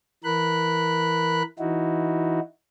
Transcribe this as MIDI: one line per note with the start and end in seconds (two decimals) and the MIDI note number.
0.24 1.43 52
0.24 1.43 70
0.24 1.43 83
0.24 1.43 90
1.59 2.40 52
1.59 2.40 63
1.59 2.40 64
1.59 2.40 66